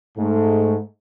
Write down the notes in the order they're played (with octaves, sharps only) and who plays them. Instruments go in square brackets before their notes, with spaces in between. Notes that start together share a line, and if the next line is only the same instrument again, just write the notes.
[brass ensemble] G#2 A3